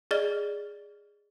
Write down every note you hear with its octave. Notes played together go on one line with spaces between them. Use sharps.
G#4 D5 D#5 F6 A6 G7